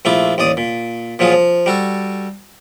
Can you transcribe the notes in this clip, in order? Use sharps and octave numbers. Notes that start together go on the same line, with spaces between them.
A#1 A3 E4 F4 D6
A1 D#2 D5 D#6
A#2
A#2 F3 F#3 F4 G#4
F3
G3 F#4 A4